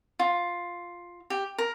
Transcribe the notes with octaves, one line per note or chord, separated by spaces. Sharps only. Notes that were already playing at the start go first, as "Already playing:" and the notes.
F4
G4
A#4